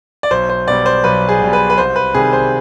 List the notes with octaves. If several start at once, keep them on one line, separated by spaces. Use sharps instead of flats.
D5
B1 C5
C5
B2 G3 D5
C5
B1 B4
G#4
B2 G3
B4
B4
C2 C5
B4
C3 D#3 G3 G#4
C5